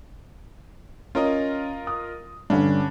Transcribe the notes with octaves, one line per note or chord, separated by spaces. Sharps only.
C#4 F4 A#4 D#5
D#6
G2 D3 C#4 D4